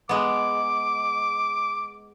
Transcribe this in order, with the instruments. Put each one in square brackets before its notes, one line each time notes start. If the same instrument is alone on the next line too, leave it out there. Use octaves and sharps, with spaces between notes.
[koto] G#3 B3 [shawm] D6